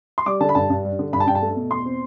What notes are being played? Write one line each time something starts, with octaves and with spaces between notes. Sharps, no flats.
C6
G3 D6
D3 A5
B5
G2 A5
G2
G3
D3
G2 B5
A5
G2 G5
A5
A3
B2
E2 C6
C4